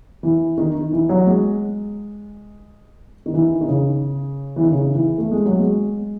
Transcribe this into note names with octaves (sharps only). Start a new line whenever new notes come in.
E3
D#3
D#3
E3
F#3
G#3
D#3
E3
D#3
C#3
E3
D#3
C#3
E3
A3
G#3
F#3
G#3